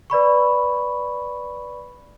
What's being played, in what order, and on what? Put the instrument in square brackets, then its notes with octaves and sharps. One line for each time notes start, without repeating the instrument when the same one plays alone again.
[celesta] B4 D5 B5 C#6